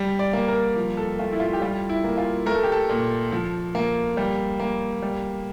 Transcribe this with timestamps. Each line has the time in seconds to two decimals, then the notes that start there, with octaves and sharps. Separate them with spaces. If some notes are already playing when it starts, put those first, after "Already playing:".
Already playing: G3
0.19 D5
0.33 A#3
0.48 A#4
0.76 F3
0.97 A4
1.19 A3 F4
1.33 E4
1.40 F4
1.53 G4
1.62 G3 F4
1.89 E4
2.04 A#3
2.18 F4
2.46 A3 A#4
2.56 A4
2.63 G4
2.72 A4
2.89 A#2
3.32 F3
3.75 A#3
4.17 G3
4.60 A#3
5.03 G3